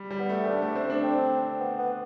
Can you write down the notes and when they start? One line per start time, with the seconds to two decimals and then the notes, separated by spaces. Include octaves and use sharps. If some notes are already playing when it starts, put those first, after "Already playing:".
Already playing: G3
0.11 G3
0.20 B3
0.29 A3
0.43 C4
0.47 A3 D4
0.62 A3
0.76 C4
0.90 D4
1.03 C4
1.60 B3
1.78 B3